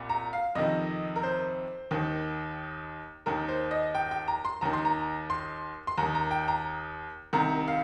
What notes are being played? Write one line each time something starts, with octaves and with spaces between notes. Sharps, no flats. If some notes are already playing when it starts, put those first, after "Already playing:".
Already playing: C2 A#2
A#5
F5
F2 C3 D#3 D#5
A#4
C5
D#2 D#3
D#2 D#3 A#4
C5
D#5
G5
G5
A#5
C6
D#2 D#3 A#5
C6
A#5
C6
C6
D#2 D#3 A#5
A#5
G5
A#5
C2 C3 D#3 A#5
F5